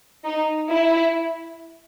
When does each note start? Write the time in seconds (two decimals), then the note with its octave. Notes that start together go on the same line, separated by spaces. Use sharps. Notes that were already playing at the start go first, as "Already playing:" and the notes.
0.25 D#4
0.71 E4